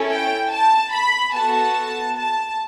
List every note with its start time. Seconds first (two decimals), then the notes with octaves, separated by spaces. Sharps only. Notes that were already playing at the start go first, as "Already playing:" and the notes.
Already playing: C#4 E4 A4
0.10 G5
0.52 A5
0.93 B5
1.34 B3 F#4 A4 A5
2.16 A5